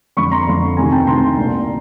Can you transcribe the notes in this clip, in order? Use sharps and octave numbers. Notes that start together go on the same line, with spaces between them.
F2 D3 B5 C#6
A#5 C6
F2 D3
D2 C3 D#3 G#5 A#5
G5 A5
D2 C3 D#3 A#5 C6
C2 A#2